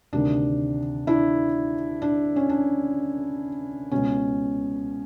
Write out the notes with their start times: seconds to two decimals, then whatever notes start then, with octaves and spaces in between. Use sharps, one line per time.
0.13 D2 C3 D#3 D4
1.07 D4 E4
2.02 D4
2.36 C#4
2.49 D4
3.91 C#2 B2 C#4